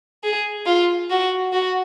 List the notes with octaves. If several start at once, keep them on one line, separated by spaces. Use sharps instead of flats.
G#4
F4
F#4
F#4